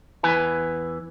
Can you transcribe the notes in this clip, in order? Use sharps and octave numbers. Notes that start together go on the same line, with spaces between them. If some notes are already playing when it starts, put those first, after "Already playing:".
E2 E4 B4 G#5